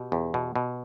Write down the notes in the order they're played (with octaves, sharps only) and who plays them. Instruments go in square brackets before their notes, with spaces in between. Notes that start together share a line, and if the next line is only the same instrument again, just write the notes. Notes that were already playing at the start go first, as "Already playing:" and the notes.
Already playing: [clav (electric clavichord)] B2 [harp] G4
[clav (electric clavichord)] E2
B2
B2